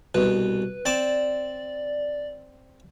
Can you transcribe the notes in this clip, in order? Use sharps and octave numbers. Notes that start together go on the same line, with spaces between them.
C2 B2 B4
C4 D5 A5 D6